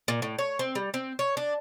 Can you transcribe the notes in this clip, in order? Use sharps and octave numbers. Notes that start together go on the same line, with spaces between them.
A#2
A2
C#5
C4
G3
C4
C#5
D4